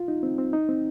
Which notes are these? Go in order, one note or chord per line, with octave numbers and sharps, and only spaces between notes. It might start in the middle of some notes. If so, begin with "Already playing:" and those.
Already playing: F4
D#4
C4
C4
D#4
C4